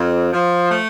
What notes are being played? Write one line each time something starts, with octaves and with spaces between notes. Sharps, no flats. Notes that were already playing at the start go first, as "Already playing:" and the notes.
Already playing: F2
F3
A3